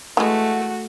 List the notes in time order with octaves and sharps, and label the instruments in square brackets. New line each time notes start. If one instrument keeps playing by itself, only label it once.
[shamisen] E3 G#3 [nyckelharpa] A3 [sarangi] F#4